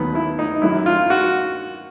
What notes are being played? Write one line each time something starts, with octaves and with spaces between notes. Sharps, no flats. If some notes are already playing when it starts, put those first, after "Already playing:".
Already playing: D#2 D#3 F#3 B3
E4
D#4
F#2 D#3 F#3 E4
F4
F#4